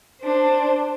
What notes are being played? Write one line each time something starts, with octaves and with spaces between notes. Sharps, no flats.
D4 C5